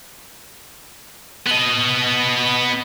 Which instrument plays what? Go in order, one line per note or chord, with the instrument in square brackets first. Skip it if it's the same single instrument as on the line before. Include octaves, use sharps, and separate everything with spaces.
[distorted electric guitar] B3 D#5